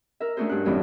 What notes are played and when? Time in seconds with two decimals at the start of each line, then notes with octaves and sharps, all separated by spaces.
0.20 A#4 E5
0.37 A3 C#4 D4 F#4 G#4 C5
0.49 G2 F#6
0.65 F2 A2 E3 F#3 G3 C#4